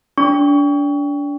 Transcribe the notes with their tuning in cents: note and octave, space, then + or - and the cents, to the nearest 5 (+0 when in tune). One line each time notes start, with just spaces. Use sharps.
D4 -30 C#6 +25